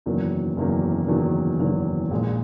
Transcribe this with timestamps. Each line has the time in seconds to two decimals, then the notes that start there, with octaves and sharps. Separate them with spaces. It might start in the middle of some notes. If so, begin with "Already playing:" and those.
0.06 F#1 E2 D#3 F#3 A#3
0.57 F#1 E2 D#3 F#3 A#3
1.08 F#1 E2 D#3 F#3 A#3
1.59 F#1 E2 D#3 F#3 A#3
2.11 A#1 A#2 G#3